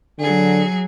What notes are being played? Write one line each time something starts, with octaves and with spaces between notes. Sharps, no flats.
D3 F#3 G#4